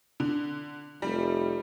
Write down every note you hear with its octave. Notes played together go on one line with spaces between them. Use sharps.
D3
F1 G3